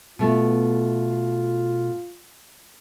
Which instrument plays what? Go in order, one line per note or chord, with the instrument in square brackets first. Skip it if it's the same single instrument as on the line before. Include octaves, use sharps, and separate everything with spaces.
[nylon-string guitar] B2 A3 [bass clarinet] F4